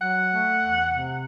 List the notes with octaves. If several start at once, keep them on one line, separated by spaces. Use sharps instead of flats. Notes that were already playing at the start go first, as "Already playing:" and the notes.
F#3 F#5
A3
E2
C3